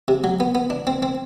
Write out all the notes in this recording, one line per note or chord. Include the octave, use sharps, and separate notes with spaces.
C3
F#3
B3
B3
D4
C4
C4